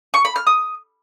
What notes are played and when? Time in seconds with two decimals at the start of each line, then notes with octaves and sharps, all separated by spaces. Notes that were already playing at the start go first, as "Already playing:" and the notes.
0.14 C#6
0.25 B5
0.36 F6
0.47 D#6